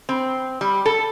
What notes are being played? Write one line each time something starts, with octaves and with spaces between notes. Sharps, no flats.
C4
G3
A4